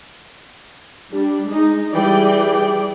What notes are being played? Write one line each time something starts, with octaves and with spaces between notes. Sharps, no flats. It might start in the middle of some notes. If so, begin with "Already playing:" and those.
G3 D4
G#3 D#4
E3 G3 G#4 D5 G5